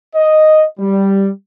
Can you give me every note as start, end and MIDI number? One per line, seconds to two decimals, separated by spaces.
0.15 0.64 75
0.79 1.28 55